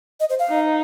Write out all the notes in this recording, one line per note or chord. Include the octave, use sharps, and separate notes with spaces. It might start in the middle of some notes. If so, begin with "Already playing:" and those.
D#5
C5
F5
D#4